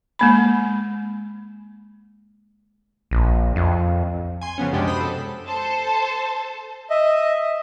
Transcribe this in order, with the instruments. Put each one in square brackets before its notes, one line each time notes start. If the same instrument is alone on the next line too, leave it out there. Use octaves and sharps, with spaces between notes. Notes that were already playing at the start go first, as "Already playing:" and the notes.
[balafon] G#3 A#3 B5
[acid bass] A#1
F2
[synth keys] G#5 C6
C#3 F3 B3 C#4
F#2 C3 G#3 D4 G4
C5 B5 D#6
A4
[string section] A4 C5 A5
[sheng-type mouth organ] D#5 E5